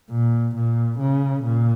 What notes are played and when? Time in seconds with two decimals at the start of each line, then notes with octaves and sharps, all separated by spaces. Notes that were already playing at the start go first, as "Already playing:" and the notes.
0.10 A#2
0.55 A#2
0.99 C#3
1.44 A#2